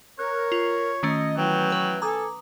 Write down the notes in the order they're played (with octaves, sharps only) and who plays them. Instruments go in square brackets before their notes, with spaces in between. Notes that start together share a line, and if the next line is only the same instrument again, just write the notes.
[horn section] A#4 [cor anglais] C#5 [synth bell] F#6
[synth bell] F4
[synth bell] D#3 A3 C#4 [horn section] D#5
[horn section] E3 G5 [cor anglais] F#3
[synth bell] B4 C#6
[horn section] A4 G#5 [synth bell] A#5 D6 D#6